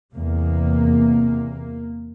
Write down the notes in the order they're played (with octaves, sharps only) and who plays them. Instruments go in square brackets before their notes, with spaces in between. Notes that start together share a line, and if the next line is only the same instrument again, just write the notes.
[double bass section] E2 C3 A#3